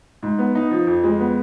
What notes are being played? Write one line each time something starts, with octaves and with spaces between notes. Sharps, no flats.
G#2
B3
D#4
F3
F2
G#3
B3